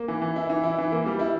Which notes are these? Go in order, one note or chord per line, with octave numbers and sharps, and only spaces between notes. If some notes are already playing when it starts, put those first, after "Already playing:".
Already playing: A#3
E3
E3
E4
E3
E4
E3
A#3
G3
E4